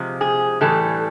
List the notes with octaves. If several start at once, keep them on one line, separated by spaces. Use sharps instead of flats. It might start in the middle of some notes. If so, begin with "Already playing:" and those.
Already playing: C3 F3 G#3
G#4
A2 E3 G3 A4